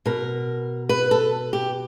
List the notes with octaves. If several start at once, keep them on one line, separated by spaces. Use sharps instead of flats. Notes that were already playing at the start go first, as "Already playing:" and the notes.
B2 A#4
B4
A4
G4